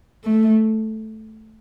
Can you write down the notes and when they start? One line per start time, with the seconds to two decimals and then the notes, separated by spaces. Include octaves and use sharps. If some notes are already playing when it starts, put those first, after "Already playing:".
0.24 A3